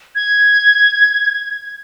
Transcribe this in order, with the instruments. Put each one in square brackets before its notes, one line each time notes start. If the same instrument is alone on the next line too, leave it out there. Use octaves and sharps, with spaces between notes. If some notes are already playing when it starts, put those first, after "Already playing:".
[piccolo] G#6